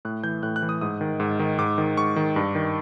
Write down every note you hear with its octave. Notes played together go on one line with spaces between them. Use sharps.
A2 F#6
E3 G6
A2 F#6
F#6
E3
D#6
G#2 D#6
D#3
G#2
D#3
G#2 D6
D#3
G#2 C#6
D#3
G2
D#3